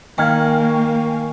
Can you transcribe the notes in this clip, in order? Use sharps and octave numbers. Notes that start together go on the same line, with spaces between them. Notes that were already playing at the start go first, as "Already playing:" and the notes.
D#3 A#3 F5 G5 G#5 C#6 F6 G#6